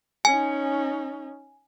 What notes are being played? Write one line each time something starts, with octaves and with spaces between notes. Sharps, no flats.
C#4 D#4 G#5